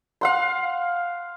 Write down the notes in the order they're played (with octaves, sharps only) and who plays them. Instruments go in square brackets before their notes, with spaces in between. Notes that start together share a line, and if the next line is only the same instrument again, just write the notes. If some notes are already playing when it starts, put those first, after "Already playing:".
[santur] F5 F#5 C6